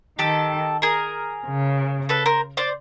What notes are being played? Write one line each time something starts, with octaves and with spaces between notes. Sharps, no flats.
D#3 G4 A4
G#4 A#4
C#3
A4 B4
A#4 C5
C5 D5